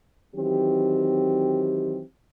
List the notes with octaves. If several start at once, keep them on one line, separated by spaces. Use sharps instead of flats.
D#3 E3 F#3 C4 G4